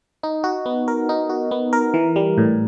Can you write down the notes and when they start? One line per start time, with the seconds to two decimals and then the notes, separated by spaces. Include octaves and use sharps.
0.23 D#4
0.44 F#4
0.66 B3
0.88 A#4
1.09 D#4
1.29 F#4
1.51 B3
1.73 A#4
1.94 E3
2.16 G3
2.38 A2